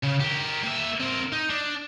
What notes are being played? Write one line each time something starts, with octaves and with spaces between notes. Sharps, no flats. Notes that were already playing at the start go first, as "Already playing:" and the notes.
C#3
G4 A#4
A#3 E5
C4 A#4
D#4
D4